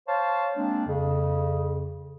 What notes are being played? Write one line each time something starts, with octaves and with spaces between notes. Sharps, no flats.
C5 C#5 F5 A5
G#3 A#3 C4 D4
F2 C#3